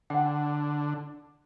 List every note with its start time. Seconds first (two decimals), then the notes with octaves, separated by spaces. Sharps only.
0.10 D3 F#5 G5